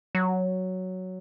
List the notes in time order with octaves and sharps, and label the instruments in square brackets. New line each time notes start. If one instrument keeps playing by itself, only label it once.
[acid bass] F#3